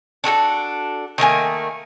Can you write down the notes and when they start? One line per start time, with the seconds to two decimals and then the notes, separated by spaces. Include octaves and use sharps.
0.24 D4 F#4 G#4 A4
1.18 D#3 A3 A#3 G#5